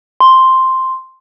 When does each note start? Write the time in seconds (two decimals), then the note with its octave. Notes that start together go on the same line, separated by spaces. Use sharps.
0.20 C6